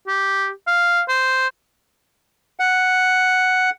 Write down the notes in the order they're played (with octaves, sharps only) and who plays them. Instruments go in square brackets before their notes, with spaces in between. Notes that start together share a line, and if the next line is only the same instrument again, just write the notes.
[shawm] G4
F5
C5
[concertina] F#5